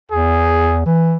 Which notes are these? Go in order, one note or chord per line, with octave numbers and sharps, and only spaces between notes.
E2 G#4
E3